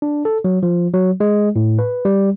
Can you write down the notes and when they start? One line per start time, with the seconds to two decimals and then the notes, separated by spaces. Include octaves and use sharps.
0.02 D4
0.25 A4
0.44 F#3
0.63 F3
0.93 F#3
1.20 G#3
1.56 A2
1.79 B4
2.05 G3